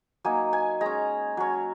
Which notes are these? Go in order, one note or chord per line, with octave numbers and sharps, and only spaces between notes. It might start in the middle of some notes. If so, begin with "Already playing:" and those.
F#3 A#3 D#4 G#5
G#5
G#3 C#4 A#5
F#3 C#4